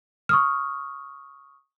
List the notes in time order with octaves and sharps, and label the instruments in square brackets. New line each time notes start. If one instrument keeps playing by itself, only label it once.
[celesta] C#6 D#6 F6